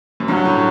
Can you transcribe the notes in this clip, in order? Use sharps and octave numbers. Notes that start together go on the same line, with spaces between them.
F#2
G2 F#3
A2